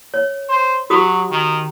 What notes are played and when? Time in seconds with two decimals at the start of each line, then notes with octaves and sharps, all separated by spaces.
0.14 C#5
0.49 C5
0.90 F#3 F#4 G4 D#6
1.30 D#3